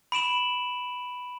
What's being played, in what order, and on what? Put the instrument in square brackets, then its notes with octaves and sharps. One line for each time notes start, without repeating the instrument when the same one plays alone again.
[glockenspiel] B5 D7 E7 F#7